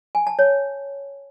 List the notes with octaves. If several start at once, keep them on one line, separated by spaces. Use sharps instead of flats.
G#5
A5
C#5